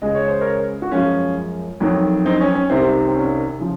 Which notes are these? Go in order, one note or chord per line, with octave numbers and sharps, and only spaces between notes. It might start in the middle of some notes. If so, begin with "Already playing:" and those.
C#2 C#3 G#3 D#5
C#5
C5
A#4 C#5
F#4
F#2 F3 G#3 C#4 F4
F2 D#3 F#3
C4 D#4
C#4
C#4
C2 C3 D#3 C4
C4
C#4
C#3 F3